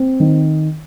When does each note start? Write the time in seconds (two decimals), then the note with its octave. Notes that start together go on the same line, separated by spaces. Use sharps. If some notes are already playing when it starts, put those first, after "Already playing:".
Already playing: C4
0.20 D#3